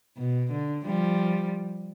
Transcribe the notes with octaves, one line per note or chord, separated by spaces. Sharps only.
B2
D3
F3 G3